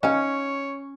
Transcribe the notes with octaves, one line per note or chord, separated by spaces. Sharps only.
C#4 D#4 C#5 F5 G#5